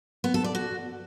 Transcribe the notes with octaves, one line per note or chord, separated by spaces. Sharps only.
B3
A4
D5
F#4